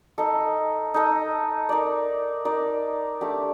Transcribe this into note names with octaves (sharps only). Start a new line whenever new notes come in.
D#4 A4 D#5
D#4 A4 D#5
D#4 A#4 D5
D#4 A#4 D5
A3 D4 G4